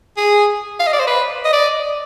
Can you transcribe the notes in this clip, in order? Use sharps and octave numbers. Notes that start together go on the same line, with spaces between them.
G#4
F5
D#5
D5
C5
B4
D#5
D5